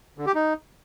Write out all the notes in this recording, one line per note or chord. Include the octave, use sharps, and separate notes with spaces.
D3
G4
D#4